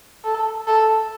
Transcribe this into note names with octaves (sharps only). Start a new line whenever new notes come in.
A4
A4